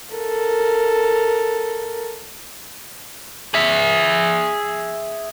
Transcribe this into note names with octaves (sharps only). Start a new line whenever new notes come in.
A4 A#4
G#4 E5